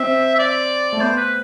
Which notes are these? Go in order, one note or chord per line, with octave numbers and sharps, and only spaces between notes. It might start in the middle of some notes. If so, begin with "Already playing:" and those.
Already playing: C4 E5
E5
D5
A3
B3 C5
B4